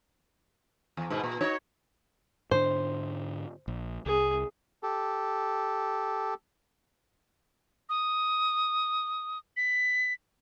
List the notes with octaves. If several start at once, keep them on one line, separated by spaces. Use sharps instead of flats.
E2
G#2 B2 B3
A#2
D#4 F#4 C#5
G#2 D3 D4 C5
A#1
C2 G#4
G4 A4
D#6
B6